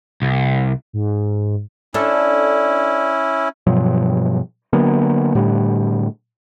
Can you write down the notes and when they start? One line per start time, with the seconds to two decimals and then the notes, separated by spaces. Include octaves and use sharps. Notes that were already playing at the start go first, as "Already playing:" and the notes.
0.22 C2
0.93 G#2
1.94 C#4 D4 E4 A4
3.67 G2 B2 F3 F#3
4.73 D3 F#3 A#3 B3
5.35 A2 D3 G3